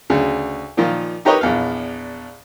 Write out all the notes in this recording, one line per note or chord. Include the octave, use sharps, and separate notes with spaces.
D2 C#3
A#2 D#3 F3 F4
D#4 G4 A#4 B4 C#5 D#5
A#1 E2 F5